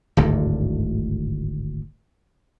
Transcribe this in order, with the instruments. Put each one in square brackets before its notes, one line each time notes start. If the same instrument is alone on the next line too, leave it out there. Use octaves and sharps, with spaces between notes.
[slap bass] D1 G#1 D2 G2